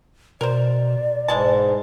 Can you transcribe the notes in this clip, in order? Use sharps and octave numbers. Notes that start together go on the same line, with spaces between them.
B2 A#4 C5 D5
E1 G#2 E3 G#3 A5